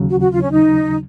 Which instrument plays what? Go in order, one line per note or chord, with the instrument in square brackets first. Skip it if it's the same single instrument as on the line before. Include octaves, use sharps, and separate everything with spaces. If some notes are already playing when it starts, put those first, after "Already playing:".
Already playing: [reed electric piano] D#2 C#3 F#3
[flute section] F#4
F#4
F4
C#4
D#4